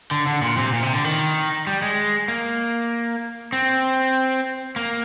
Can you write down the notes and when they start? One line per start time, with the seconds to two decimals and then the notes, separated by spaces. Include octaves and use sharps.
0.11 D3
0.27 D3
0.42 A#2
0.57 C3
0.73 A#2
0.83 C3
0.94 D3
1.04 D#3
1.67 G3
1.82 G#3
2.28 A#3
3.53 C4
4.76 A#3